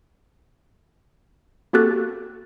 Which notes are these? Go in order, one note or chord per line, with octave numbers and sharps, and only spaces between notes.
A#3 F#4 G4 A4 F#6 A6